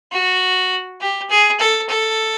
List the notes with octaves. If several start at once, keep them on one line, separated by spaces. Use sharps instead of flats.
F#4
G4
G#4
A4
A4